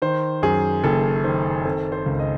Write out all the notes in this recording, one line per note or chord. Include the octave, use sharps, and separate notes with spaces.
D#3 C5
F#2 G#4
F#1 A4
D#3 C5
C4 A4
C5
C#2
D#5